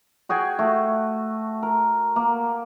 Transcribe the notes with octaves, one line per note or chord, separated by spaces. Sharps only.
F#4 G#4 G5 G#5
A3 F#4
A#4
A#3